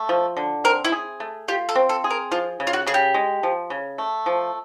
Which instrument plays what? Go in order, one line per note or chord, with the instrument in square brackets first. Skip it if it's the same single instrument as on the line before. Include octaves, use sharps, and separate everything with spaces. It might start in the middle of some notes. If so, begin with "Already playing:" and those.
Already playing: [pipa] A3
F3
D3
[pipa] C4 [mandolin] A#4
[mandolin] E4
[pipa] G#4
A3
[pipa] F4 [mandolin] G4
[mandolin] A4
[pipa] C4
[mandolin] A4
[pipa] G#4
[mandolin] A#4
[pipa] F3 [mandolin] F4
[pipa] C#3
[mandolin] F4
F#4
[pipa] C#3 [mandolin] G#4
[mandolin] G4
[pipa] G#3
F3
C#3
A3
F3